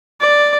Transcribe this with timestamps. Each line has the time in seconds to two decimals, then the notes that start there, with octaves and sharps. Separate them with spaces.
0.20 D5